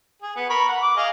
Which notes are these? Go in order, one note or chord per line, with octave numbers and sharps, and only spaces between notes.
G#4
B3
A#4 B5 C#6
F#5
D6
G#4 D#5 F5